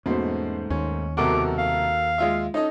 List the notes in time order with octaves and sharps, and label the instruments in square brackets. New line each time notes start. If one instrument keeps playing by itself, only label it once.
[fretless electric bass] E2 A#3 C#4 [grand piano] G#2 A3 C5 [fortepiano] B2
[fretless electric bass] D#2 [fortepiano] C#4
[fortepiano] C2 B2 [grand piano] F#4 A4 A#4 [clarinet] D6
[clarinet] F5
[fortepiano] G#3 F4 E5
[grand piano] C#4 A4 D#5 [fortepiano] D#4